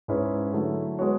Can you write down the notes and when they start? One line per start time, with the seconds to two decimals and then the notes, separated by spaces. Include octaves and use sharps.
0.08 G#2 G#3 C#4 E4 B4
0.53 D3 F#3 A3 E4
0.99 G#3 B3 F#4 C#5